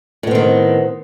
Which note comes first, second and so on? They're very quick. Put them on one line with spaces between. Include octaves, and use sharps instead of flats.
A2 B3 C4 D#3